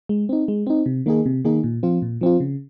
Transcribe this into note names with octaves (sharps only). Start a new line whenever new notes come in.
G#3
C4 D#4
G#3
C4 D#4
C3
D#3 A#3 D#4 G#4
C3
D#3 A#3 D#4 G#4
A#2
F3 C4 F4
A#2
F3 C4 F4
C#3